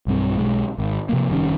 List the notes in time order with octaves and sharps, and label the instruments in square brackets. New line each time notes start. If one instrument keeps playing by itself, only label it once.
[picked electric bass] B1 G2 C4
B1 G#3
G#1
C3 F3 A#3
F1 G2 D#3 C#4